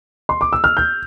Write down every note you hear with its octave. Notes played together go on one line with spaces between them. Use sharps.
C6
D6
E6
F6
G6